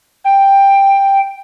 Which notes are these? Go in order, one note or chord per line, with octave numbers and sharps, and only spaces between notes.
G5